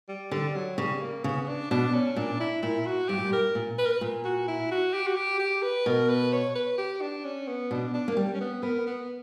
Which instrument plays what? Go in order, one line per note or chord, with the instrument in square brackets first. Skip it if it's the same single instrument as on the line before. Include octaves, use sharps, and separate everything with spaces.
[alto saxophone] G3
[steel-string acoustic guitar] D3 [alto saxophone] G3
[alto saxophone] F#3
[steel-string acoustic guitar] C#3 [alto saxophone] G3
[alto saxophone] A#3
[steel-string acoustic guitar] C#3 [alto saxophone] B3
[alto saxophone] D4
[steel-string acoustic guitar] B2 [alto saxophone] D4
[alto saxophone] C#4
[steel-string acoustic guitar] A#2 [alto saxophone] D4
[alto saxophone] E4
[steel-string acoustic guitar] A#2 [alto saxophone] E4
[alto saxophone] F#4
[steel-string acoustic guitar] G2 [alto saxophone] G4
[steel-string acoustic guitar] A#2
G2
[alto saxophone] A#4
[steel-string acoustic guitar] A#2
[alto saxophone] B4
A#4
B4
[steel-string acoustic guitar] A#2
[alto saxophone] F#4
E4
F#4
G4
F#4
G4
G4
B4
[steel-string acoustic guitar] B2 [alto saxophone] A#4
[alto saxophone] B4
C#5
B4
G4
D4
C#4
B3
[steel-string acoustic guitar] B2 [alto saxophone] D4
[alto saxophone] D4
[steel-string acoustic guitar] A#3
G3
[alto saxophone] C#4
B3
[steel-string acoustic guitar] B3 [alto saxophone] A#4
[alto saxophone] B3